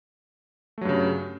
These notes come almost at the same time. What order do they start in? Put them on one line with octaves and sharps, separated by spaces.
A3 F#3 G2 C#3